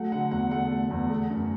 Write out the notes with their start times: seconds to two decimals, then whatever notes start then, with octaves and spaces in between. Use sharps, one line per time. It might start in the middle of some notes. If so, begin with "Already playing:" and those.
Already playing: F#3 A3 F#5
0.12 D3 F#5
0.31 E2 F#5
0.51 A3 F#5
0.71 A3
0.91 E2
1.11 A3
1.30 F#2